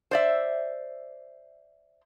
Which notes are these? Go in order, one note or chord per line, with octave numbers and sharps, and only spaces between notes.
C5 D5 E5